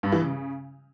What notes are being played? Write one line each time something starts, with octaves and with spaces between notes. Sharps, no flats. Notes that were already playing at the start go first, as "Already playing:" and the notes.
G2
E3
C#3